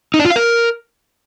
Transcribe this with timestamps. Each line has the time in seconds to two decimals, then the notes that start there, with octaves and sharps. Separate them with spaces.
0.14 D#4
0.19 D4
0.25 F4
0.30 F5
0.36 A#4